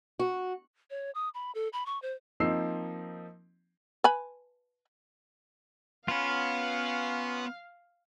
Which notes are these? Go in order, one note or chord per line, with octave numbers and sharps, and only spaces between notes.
F#4
C#5
D#6
B5
A4
B5
C#6
C5
F3 A#3 C4 D#4 E6 C7
B4 G#5 B5
B3 C#4 F4 F5 B5